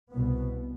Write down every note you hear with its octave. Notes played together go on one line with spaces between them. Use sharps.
C2 B2 B3